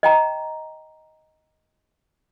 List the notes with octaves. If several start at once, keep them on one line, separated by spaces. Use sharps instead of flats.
D#5 G5 A#5